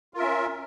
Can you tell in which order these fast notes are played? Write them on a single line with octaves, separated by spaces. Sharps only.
F4 A#4 E5 C#4